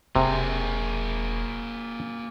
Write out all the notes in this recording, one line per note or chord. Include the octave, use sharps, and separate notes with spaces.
E1 C3 A#3 G#4